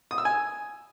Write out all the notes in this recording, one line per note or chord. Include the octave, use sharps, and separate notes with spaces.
D#6
E6
G#5